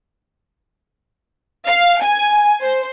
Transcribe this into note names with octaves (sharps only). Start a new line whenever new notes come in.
F5
G#5
C5